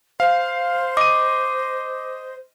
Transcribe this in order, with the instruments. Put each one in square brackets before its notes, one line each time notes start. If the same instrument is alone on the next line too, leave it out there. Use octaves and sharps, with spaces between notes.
[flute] C5 [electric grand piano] F5
[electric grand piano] D#5 D#7 [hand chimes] D6